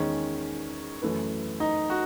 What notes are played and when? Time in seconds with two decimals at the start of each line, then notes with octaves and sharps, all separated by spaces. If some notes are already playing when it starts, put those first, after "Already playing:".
Already playing: E2 D#3 G#3 C#4
1.02 F#2 E3 A3 E4 B4
1.60 D#4
1.90 F#4